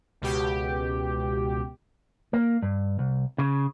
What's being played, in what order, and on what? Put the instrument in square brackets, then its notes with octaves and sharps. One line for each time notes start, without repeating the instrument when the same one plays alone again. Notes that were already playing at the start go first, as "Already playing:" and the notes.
[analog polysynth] C#2 B2 G4
[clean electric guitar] A#3
G2
C2
C#3